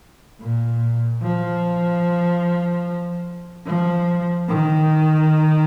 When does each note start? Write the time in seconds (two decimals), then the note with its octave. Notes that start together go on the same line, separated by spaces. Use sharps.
0.41 A#2
1.23 F3
3.66 F3
4.49 D#3